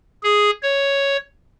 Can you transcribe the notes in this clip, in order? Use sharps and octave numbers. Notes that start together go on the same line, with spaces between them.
G#4
C#5